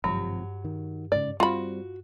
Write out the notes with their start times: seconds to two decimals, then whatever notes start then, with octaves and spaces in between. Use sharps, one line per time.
0.04 G#1 G2 C3 F3 F#3
0.65 D#3
1.12 G#2 C#3 D5
1.40 G3 C4 F4 F#4 B5